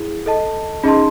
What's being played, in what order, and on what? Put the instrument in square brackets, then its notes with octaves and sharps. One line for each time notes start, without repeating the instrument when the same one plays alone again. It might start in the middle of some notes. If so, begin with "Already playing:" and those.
Already playing: [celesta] E4 G#4
A4 D#5 A5
[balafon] C#4 [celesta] D#4 G#4 D#5 A5 C6